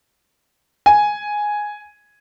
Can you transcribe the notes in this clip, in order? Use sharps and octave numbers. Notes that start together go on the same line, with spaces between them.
G#5